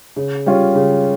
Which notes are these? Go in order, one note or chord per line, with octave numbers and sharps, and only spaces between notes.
C#3
G3 C#4 F4
C#3